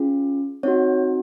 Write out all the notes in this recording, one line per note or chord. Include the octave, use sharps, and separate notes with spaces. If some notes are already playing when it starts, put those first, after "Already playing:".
Already playing: C#4 F4 G#4
C4 D#4 F#4 C#5